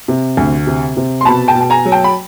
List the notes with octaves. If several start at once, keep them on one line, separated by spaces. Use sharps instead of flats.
C3
D2
C3
C3
C6
B2 A5 B5
G5 A5
B2
A5
G#5 A#5
F#3
G5 A5
B5